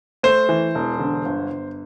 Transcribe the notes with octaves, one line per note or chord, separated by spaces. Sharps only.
A3 C5
E3
E1
D3
G1
G1